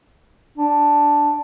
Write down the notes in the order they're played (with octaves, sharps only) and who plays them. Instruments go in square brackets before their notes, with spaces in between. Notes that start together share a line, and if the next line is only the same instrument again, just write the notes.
[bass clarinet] D4